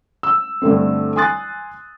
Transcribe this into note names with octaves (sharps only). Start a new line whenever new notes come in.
E6
G2 D3 G3 A3 C4
G#5 C6 D#6 F#6 A6